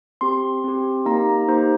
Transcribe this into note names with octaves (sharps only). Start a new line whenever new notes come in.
C4 G4 C6
C4 G4
A#3 D#4 G4 A#5
A#3 D#4 G4 C5